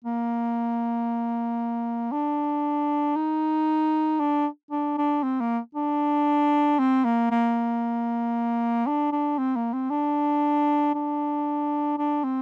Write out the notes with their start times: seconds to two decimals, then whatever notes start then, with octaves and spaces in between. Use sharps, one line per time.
0.05 A#3
2.12 D4
3.16 D#4
4.19 D4
4.71 D4
4.97 D4
5.23 C4
5.40 A#3
5.75 D4
6.79 C4
7.05 A#3
7.31 A#3
8.87 D4
9.12 D4
9.38 C4
9.56 A#3
9.73 C4
9.91 D4
10.94 D4
11.98 D4
12.24 C4